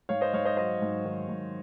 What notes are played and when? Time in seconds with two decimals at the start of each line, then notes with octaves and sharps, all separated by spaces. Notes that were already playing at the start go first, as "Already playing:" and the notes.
0.09 G#2 C#5 F5
0.21 C5 D#5
0.34 G#2 C#5 F5
0.45 C5 D#5
0.57 F#3 C5 D#5
0.82 G#2
1.05 D#3
1.29 G#2